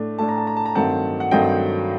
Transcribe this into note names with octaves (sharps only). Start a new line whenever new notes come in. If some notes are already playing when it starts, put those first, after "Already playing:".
Already playing: A2 A3 D4
A2 A3 D4 A5
A#5
A5
A#5
A5
A#5
G2 D#3 F#3 A3 C4 F#5 A5
F#5
G2 D#3 F#3 A3 C4 D#5 G5